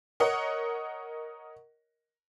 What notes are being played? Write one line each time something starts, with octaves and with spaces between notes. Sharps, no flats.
A#4 C#5 D#5 F#5